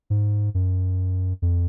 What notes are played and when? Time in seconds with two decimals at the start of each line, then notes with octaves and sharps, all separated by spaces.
0.10 G#2
0.54 F#2
1.42 F2